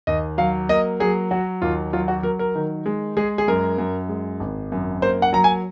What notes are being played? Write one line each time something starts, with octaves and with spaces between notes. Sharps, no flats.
D#2 D#5
F#3 F5
A#3 D#5
F#3 G#4
F#3 F#4
D#2 F4
F#3 F4
F#4
F#3 A#4
A#4
D#3
G#3
G#3 G#4
G#4
F#2 A#4
F#2
G#3
G#1
F#2
A#3 C5
F#5
F#3 A#5
G#5